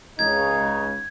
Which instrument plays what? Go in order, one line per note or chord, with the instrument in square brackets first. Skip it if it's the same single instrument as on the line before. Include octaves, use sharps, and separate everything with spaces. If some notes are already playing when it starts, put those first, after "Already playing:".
[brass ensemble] C#2 C#3 [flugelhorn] D#4 [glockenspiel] G#6